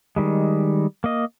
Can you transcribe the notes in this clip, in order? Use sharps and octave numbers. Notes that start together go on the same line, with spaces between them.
D#3 G3 G#3
A#3 D#5